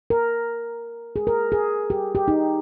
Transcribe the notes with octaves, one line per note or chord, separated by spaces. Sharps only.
A#4
G#4
A#4
G#4
G4
G4
D#4